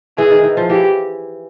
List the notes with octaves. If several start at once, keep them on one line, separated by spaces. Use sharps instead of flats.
E3 G#4
D#3
E3
F3
E3 G4